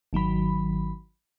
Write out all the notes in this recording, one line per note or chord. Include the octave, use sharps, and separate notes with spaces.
G#1 D#3 F#3 B5